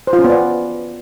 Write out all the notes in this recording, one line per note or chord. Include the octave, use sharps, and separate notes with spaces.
C5
F4
C#4
B3
D5